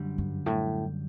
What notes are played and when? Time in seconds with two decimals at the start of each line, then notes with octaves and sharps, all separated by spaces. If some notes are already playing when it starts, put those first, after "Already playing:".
Already playing: F#2 D3 G3
0.18 G2
0.46 A2